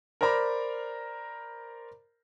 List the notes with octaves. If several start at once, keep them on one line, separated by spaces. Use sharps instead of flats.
A#4 C5 D5 A#5 B5